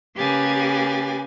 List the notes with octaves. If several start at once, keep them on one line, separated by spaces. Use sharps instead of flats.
C#3 A#3 G4 B4 G#5 A6